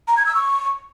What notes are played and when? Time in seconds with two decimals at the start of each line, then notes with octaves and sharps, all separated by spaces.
0.08 A#5
0.17 G#6
0.26 E6
0.35 C#6